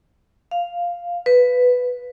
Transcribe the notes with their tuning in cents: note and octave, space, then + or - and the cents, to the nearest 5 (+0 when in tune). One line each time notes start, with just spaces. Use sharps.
F5 +0
B4 +5